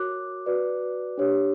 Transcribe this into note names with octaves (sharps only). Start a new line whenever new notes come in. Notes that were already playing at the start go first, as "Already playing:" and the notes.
Already playing: F#4 A#4 C#5 D6 F#6
F#4 B4 D5
D4 G4 C#5